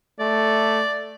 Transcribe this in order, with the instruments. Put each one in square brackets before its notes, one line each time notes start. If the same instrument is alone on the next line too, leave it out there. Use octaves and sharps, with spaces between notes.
[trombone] A3 [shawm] D5